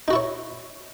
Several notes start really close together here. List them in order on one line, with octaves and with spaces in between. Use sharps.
D#4 F#4 E4 C#5